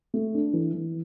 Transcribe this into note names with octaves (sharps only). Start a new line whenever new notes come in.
A3
D4
E3
E3